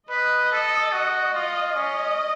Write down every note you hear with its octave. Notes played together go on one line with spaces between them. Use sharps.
B4 D#5
A4
F#4
F4 D#5
C#4 D#5